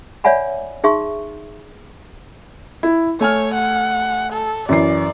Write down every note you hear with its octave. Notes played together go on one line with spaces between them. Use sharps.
C#5 D5 E5 F#5 G#5 B5
D#4 G#4 E5 C6 C#6
E4
A3 C#5 G#5 F6
F#5
A4
F#2 E3 D5 C7